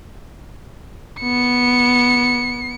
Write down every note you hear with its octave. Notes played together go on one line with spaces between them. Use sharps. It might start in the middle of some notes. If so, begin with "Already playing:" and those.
B3 C#7